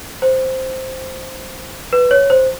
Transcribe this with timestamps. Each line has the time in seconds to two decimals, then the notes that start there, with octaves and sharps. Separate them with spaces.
0.22 C5
1.93 B4
2.11 C#5
2.30 C5